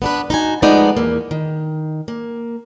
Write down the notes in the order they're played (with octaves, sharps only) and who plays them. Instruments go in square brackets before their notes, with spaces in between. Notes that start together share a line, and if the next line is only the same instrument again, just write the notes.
[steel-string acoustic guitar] B3 D4 B4
D#4 F#4 G#5
F3 G#3 A3 B3 D#4 D5
E2 A#3
D#3
A#3